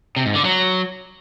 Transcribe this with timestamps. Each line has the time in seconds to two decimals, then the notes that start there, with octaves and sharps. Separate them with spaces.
0.16 C3
0.26 G#2
0.35 D3
0.45 F#3